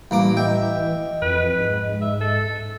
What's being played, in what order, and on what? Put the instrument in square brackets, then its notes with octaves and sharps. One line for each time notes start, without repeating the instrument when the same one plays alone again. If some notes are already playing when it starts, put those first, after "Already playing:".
[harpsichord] A1 A#3 D6 [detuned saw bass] E3 [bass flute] G3
[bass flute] D#5 [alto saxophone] E5 [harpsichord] G5
[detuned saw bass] F2 [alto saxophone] B4
[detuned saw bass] G#2
[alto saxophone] E5
A4